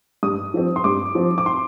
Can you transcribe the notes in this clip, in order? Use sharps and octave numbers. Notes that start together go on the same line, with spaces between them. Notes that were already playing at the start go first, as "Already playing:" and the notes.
G2 D#6
F3 C4
C6
G2 D6
F3 C4
D6
C6